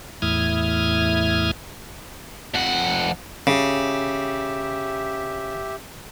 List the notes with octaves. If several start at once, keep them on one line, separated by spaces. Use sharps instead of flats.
E2 A2 E4 D#6 F6 G#6
F2 F#5
C#3 G4 E5